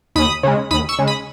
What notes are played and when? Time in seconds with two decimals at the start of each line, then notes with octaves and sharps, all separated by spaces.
0.16 D#2 B5 D#6
0.43 C#3 G#3
0.71 D#2 B5 D#6
0.89 C#6 E6
0.99 C#3 G#3
1.07 B5 D#6